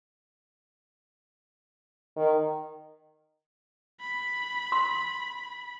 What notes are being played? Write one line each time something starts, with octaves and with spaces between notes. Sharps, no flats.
D#3
B5
C6